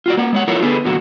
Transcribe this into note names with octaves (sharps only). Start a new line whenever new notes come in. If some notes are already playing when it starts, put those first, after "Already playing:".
F4 F#4 D5
A#3 F#5
G#3 C#5 F#5
F3 E4 F4 A4 A#4 C#5
D3 B3 G#4 A4 B4
E2 A#2 D3 F#3 F#4